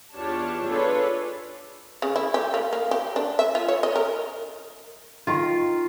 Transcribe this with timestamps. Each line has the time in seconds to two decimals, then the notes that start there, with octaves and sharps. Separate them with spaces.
0.14 E2 D4 F4 G4 C#5 A5
0.68 D4 F4 G#4 A4 B4 C#5
2.02 C#3
2.16 E4
2.34 G4
2.54 A#3
2.73 A#3
2.91 G4
3.16 D4
3.39 E5
3.55 F4
3.68 C#5
3.83 D#5
3.96 A#4
5.27 D#3 F4